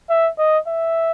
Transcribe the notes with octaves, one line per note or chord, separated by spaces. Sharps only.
E5
D#5
E5